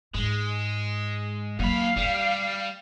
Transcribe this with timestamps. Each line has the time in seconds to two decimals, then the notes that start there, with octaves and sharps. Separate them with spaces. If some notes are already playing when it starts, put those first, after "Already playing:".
0.15 G#2 G#3
1.59 F#2 F#3 A#3 F5 B5
1.96 G3 A3